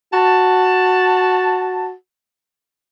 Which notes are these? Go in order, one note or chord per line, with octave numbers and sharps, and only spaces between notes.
F#4 A5